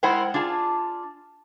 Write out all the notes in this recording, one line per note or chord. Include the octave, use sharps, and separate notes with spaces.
G#3 E4 A#4 C5 F#5 G5
D4 F4 G#4 A5